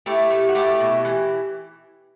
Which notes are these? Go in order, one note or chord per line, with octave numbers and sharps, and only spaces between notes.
A3 E4 G4
A3
F#4
A3 E4 G4
B2
E3